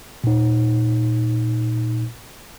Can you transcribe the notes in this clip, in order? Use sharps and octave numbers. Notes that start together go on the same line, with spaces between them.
A#2 D#4